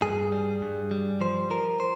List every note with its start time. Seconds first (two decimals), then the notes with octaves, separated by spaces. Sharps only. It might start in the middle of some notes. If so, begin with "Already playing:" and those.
0.02 G2 G#4
0.32 G3
0.62 G2
0.91 G3
1.21 F3 C5
1.50 F3 A#4
1.80 C5